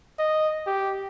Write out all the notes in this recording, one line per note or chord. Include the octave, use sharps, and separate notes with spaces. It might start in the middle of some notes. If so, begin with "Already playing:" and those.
D#5
G4